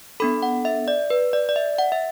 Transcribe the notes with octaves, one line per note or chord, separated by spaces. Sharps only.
B3 D4 A4 B5
F#5
E5
D5
B4
D5
D5
E5
F#5
E5